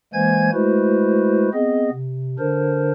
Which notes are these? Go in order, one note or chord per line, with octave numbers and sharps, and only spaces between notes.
E3 G#3 A#3 C5 G#5 G#6
G#3 A3 E4 F#4 B4 C5
B3 C4 G#4 D#5
C3
D3 D4 A#4 C5